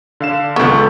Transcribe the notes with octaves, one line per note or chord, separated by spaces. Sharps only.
D3 F5 E7
C#2 B3 A4 C#6